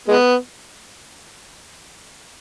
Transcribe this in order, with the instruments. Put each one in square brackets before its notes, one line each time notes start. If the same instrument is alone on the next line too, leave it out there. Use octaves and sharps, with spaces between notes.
[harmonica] G#3 B3